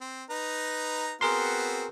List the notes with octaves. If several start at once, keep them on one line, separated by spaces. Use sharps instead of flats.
C4
D#4 B4 A#5
B3 C4 F#4 G#4 A#4 C6